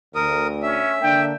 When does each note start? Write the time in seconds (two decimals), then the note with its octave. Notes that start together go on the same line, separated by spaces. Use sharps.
0.15 D2 A#4 D#6
0.62 C#4 E5
1.02 D3 A#3 D4 G5